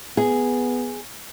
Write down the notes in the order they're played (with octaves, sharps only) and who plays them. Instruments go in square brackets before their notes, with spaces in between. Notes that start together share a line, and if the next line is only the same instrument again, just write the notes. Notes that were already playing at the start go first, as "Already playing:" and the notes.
[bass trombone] B3 [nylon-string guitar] G#4